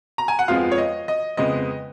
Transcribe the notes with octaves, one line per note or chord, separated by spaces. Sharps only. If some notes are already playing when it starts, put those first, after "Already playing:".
A#5
G#5
F#5
F2 F3 G#3 B3 F4 F5
C#5
D#5
D#5
F2 C#3 G#3 B3 D#5